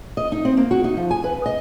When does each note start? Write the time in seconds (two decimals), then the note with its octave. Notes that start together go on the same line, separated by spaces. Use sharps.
0.17 D#5
0.32 D#4
0.45 C4
0.57 A#3
0.71 F#4
0.84 D#4
0.97 F3
1.11 G#5
1.24 B4
1.46 D#5